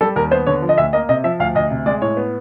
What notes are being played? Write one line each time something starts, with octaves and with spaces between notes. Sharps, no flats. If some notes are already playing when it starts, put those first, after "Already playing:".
G3 A4
D#2 A#4
B3 C5
D3 C#5
F3
D#5
D2 E5
A#3 D#5
C3 D#5
F3 E5
D2 F5
D2 D#5
C3
G#3 D5
A2 C#5
B3